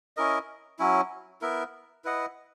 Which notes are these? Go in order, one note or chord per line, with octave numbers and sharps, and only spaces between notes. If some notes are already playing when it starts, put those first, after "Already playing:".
C#4 E4 A#4 D#5
F#3 C#4 E4
B3 E4 A#4 E5
E4 B4 D#5 F#5